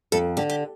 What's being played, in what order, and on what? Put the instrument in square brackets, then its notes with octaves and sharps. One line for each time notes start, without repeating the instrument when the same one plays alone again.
[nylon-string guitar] F2 [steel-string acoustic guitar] A4
[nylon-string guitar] D3 [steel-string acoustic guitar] G4
[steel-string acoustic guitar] G4